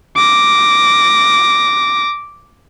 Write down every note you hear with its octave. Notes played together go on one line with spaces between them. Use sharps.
D6 A#6